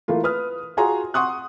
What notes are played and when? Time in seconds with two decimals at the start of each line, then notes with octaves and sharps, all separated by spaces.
0.08 E3 A3 A#3 F4
0.24 B4 D#6 F6
0.77 F4 F#4 G#4 G#5 A#5 C6
1.14 F#5 C6 C#6 D#6 F#6